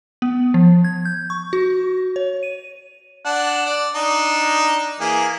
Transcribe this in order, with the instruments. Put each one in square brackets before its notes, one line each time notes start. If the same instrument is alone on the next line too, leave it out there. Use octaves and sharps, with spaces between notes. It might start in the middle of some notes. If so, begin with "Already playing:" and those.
[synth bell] B3
F3
G#6
G6
C#6
F#4
C#5
D#7
[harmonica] D4 F#5 A5
D5
D4 D#4
E3 A#3 G#4